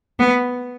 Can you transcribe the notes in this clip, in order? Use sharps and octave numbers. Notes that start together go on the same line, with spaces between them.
B3